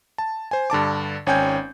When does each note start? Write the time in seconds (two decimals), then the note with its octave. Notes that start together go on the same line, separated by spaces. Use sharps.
0.18 A5
0.51 C5 G#5
0.70 G2 D3 A5 D6
1.27 G#1 C#4 C#5 G5 G#5 G6